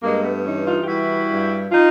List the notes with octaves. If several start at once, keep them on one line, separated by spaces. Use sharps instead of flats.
G2 G#3 A#3
A3 B3
E3 C#4 D#4
D#4 F4
G4
G3 E4 F#4
G2
D#4 F4